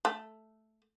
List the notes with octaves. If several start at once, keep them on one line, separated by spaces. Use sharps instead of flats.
A3